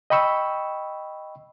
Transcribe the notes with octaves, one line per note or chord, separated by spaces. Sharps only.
D#5 G5 B5 C#6 E6